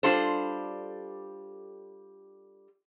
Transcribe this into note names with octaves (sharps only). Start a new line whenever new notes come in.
G3 D4 F4 G4 A4 C5